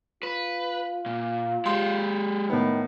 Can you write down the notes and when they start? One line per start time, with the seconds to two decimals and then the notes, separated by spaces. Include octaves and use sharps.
0.23 F4 B4
1.06 A#2
1.66 G#3 G4 C6
2.50 A2 D#3 B3